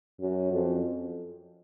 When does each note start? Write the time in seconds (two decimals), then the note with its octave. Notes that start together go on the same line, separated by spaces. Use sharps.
0.20 F#2
0.52 F2